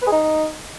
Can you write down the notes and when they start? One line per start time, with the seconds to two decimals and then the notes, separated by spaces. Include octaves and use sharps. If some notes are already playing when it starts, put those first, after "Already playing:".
0.02 B4
0.07 G#4
0.12 D#4